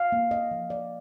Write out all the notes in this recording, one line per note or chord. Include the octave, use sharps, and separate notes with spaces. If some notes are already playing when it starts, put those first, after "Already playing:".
Already playing: F5
A#3
A#3 D#5
F3
F3 D5